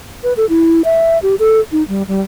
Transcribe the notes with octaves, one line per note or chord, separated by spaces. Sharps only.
B4
A4
E4
E5
G4
A4
D#4
G3
G3